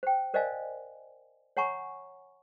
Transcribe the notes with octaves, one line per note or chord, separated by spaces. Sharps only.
C5 G5
A#4 C5 D5 D#5 F5 G#5
C#5 F#5 G#5 A#5 C#6